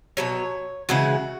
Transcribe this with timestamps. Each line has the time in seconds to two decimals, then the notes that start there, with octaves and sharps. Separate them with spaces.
0.17 B2 F#3 C#5
0.89 C#3 E3 G#3 F#4